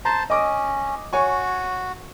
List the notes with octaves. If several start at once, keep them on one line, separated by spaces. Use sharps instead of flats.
C5 A5 A#5 C6
C#4 D#5 D6 D#6
F#4 C#5 G#5 C#6